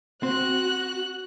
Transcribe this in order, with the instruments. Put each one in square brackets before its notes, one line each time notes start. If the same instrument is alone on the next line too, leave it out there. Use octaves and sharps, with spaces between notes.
[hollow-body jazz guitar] C4 [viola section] F#4 [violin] F#6